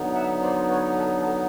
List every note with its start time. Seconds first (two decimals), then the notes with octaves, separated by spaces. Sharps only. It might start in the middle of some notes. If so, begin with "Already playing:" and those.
Already playing: D3 F#3 B3 D#4
0.14 E5 F#5
0.42 C5 D5
0.69 B4 C#5
0.97 A4 B4
1.18 A4 B4